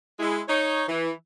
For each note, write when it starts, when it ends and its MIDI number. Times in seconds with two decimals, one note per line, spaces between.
0.19 0.40 56
0.19 0.40 64
0.48 0.84 63
0.48 0.84 73
0.88 1.11 52